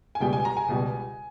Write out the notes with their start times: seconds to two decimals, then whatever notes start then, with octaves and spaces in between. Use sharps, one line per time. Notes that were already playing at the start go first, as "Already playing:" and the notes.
0.15 G#5
0.20 C#2 B2 G3 G5
0.33 G#5
0.45 A#5
0.57 G#5
0.69 C#2 B2 G3